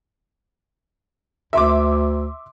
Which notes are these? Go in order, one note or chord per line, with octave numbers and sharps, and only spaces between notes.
D2 E5 C6 D6